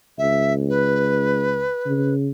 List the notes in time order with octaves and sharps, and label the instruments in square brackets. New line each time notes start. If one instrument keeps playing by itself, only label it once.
[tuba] C#2 [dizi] E5
[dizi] B4
[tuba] C#3